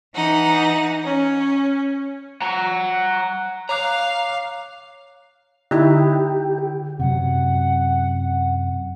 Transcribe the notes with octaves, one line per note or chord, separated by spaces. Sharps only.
E3 D#4 F#5
C#4
F#5 A#5
C#5 F5 A#5 D6 F#6
D3 D#4 E4 G4
F#2 C3 F#3 F#5